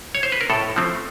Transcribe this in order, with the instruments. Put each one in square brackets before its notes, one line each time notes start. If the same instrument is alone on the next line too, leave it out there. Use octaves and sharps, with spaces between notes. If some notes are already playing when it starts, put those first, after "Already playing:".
[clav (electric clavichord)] C#5
C5
B4
A#4
A2 A4
F3 A3 C4